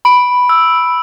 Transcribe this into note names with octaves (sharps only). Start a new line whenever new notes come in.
B5 D7
E6